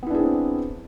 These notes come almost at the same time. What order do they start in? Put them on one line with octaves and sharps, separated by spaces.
B3 E4 D4 G#4 C4